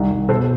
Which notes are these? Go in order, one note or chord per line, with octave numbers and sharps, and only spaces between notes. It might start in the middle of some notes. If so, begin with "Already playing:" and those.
Already playing: C2 D#3
C2
B2 A4 C5